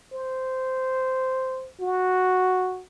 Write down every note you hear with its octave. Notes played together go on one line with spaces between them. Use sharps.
C5
F#4